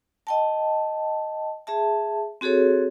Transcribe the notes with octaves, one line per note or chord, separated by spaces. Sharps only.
D#5 G5 A5
G#4 E5 A5
C4 F#4 G#4 A4 C#5